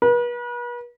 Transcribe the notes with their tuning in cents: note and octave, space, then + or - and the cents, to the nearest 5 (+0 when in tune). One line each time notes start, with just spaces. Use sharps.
B4 -40